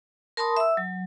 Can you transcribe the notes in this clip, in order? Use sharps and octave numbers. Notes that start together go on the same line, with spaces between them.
A#4 A5 B5 C6 D#6
E5 E6
F#3